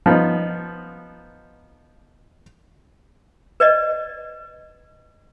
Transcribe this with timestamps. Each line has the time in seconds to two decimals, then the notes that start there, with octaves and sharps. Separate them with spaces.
0.06 F3 B3 D#4
3.60 B4 D5 D#5